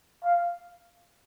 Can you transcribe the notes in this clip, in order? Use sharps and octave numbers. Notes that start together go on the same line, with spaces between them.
F5